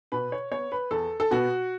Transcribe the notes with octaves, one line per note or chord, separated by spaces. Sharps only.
B2 B4
C#5
B3 C#5
B4
E2 A4
A4
B2 B3 F#4